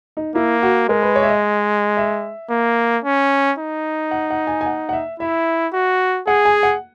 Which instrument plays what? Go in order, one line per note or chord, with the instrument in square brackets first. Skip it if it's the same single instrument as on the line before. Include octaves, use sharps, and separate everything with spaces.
[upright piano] D#4
[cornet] A#3 [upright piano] E4
[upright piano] F#4
[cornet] G#3 [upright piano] A#4
[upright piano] B4
C#5
E5
D#5
E5
[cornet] A#3
C#4
D#4
[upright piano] F#5
F#5
G#5
G#5
F#5
F#5
E5
[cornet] E4 [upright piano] E5
[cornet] F#4
[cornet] G#4 [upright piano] F#5
[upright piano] G#5
F#5